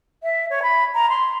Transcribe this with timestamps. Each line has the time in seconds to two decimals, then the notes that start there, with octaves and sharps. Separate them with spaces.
0.23 E5
0.49 C#5
0.62 B5
0.94 A#5
1.09 C6